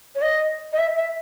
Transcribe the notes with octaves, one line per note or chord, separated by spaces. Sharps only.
C#5
D#5
D#5
E5
E5